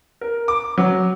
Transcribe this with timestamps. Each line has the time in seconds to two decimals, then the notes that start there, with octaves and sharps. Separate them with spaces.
0.21 A#4
0.48 D6
0.78 F#3